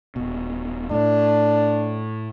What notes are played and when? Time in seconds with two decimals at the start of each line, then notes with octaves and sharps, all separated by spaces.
0.16 D#1 B2
0.91 A2 D4